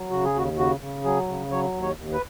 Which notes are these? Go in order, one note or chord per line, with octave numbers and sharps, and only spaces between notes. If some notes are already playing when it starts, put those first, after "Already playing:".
Already playing: F#3
C#3 F#4
G#4
D#2 F#4
C#3 F#4
C#3
F#3 G#4
C#3
F#3 C#5
D#2
C#5
D#2
B4